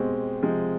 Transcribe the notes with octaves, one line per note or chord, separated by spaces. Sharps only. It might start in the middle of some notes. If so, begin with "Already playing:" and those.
Already playing: B2 G#3 C4 G4
C3 F3 G#3